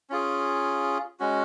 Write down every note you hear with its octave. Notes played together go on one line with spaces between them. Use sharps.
C#4 F4 G#4
G#3 C#4 F#4